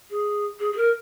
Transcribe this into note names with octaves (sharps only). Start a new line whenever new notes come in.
G#4
G#4
G#4
A#4